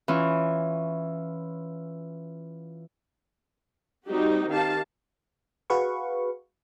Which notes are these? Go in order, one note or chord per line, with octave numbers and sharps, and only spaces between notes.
E3 C#4 F4
G3 C4 D#4 F#4 G4
D#3 G4 F5 A5
F#4 G#4 B4 F5 C#6